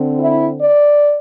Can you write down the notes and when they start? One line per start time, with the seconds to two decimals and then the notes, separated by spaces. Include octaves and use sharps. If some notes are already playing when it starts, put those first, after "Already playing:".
Already playing: D3 C4
0.20 E4
0.62 D5